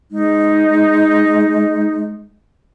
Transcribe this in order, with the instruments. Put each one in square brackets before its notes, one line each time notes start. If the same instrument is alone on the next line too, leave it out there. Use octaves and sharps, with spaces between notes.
[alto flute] G#3 [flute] D#4